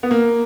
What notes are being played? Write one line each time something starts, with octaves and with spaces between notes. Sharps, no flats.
B3
A#3